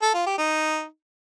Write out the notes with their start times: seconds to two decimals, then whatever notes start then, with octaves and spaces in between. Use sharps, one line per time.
0.02 A4
0.14 F4
0.26 G4
0.38 D#4